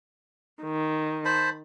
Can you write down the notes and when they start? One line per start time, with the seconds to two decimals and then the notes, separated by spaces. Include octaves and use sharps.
0.63 D#3
1.25 C5 A5 B5